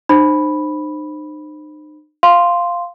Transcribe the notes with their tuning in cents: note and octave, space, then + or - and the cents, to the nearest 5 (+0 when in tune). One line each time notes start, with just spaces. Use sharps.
D#4 -45 C5 +10 B5 +0
F5 +0 C6 +0